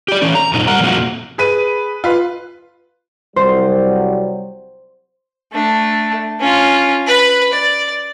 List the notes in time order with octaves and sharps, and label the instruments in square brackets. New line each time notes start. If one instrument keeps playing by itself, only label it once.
[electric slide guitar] G4 D5
E3 C#4
A#5
F#2 A#2 D#4
G3 A#4 F#5 A#5
F2 A#2 A#3 F#4
[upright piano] G#4 B4 D#7
F4 B4
[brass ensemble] C2 F#3 G3 [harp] C5
[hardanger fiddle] A3 D4
C#4 F4
B4 B5
D5